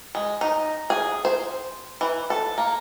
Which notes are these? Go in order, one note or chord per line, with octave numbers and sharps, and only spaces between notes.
G#3
D#4
G#4
C5
E3
A4
A#3